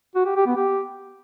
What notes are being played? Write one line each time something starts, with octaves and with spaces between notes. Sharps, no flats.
F#4
G4
G4
B3
G4